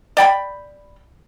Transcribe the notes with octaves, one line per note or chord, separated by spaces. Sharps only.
D5 G5 B5